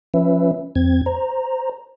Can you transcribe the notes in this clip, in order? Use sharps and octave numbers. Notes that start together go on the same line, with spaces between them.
F3 C#4 B4 E5
F2 C4 G#6
C5 A#5